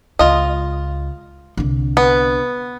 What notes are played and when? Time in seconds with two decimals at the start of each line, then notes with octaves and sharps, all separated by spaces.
0.19 C#2 F4 D#5
1.57 C2 D3
1.97 B3